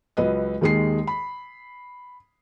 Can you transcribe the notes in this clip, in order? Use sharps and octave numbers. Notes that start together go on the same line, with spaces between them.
C#2 F#3 B4 D#5
D#2 D#3 G#3 G#4 C7
B5